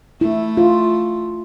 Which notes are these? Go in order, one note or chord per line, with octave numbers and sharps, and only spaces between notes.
A3 E4
F4